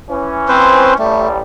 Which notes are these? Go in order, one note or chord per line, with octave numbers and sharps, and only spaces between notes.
E3 C#4
C4 B4 C5
A1 G3 A3